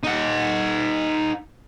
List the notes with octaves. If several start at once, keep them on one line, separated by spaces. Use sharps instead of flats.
D#4 F#5